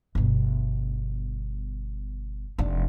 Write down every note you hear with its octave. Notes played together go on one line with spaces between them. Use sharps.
G1 B2
F1 D4